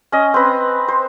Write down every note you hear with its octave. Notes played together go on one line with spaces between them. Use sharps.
C#4 D#5
C4 B4
C5